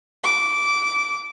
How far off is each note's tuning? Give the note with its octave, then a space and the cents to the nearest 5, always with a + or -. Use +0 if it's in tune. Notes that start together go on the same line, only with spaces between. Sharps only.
D6 -15